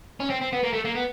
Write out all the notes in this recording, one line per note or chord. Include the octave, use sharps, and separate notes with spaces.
C#4
C4
C4
B3
A#3
A3
A#3
B3